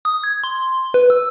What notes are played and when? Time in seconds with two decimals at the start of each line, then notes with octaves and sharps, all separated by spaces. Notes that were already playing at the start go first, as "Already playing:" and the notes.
0.05 D#6
0.24 G#6
0.44 C6
0.94 B4
1.10 E6